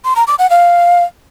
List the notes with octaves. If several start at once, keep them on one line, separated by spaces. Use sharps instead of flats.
C6
A#5
D6
F#5
F5